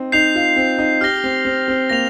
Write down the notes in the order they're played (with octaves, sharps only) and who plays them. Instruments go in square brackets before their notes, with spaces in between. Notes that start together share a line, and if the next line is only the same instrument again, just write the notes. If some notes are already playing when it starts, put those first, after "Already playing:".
Already playing: [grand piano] C4 D#4
[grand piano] D#4 [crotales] G6 C7 F7
[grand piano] F4
C4
D#4
[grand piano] G4 [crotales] F6 A#6 G7
[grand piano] C4
C4
C4
[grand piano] A#3 [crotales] A#6 F7